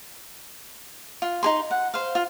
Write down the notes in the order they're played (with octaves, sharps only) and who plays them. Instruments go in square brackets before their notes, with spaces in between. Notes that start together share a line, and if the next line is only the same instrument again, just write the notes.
[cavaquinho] F4
D#4 G#4 C6
F#5
C5 F5
F4